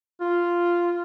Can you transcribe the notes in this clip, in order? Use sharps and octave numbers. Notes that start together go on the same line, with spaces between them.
F4